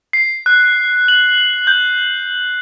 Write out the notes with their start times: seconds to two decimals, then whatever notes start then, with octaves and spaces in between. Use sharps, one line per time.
0.13 C7
0.46 F#6
1.08 F#7
1.67 G6